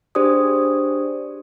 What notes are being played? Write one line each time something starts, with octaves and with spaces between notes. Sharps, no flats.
D4 G4 G#4 C5 D5 D#6